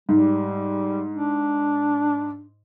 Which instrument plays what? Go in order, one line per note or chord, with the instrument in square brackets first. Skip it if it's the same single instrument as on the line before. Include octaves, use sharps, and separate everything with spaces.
[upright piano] G#2 [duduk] G3
[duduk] D4